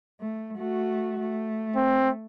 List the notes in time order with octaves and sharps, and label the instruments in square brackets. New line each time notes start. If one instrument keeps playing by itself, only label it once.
[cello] A3
A3 F#4
A3
[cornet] C4